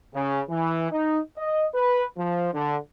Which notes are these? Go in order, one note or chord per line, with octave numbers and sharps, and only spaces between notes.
C#3
E3
D#4
D#5
B4
F3
D3